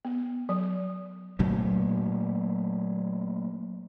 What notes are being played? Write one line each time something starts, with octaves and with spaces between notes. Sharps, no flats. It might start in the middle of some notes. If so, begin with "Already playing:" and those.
B3
F#3
A#2 F#3 A3 A#3